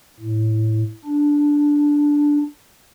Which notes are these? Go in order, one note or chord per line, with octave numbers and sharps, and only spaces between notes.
A2
D4